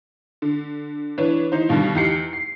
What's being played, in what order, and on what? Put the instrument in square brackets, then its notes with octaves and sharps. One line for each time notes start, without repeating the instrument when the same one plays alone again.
[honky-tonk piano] D3
E3 D4 B4 C#5
E3 D#4 C5
G2 B2 D3 D#3 G3
E2 D#4 G4 C7 C#7
C7